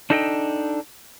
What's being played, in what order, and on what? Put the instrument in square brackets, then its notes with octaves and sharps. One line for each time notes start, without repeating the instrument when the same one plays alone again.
[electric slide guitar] D4 D#4 A4 D#5 F#5 G5